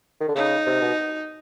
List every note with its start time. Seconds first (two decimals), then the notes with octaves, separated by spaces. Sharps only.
0.20 D#3
0.28 D3
0.35 C#3 D#4
0.67 C3
0.82 B2